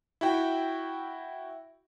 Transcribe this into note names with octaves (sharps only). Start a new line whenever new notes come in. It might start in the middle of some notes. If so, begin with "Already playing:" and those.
E4 F#4 G5